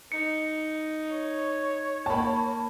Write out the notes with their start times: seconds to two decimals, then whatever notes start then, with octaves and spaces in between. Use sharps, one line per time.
0.12 D#4 C#7
1.12 C#5
2.06 A#3 A5 B5